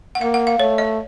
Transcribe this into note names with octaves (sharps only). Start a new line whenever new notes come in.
F#5
A#3 F5
F#5
F5
A3 C#5
D#5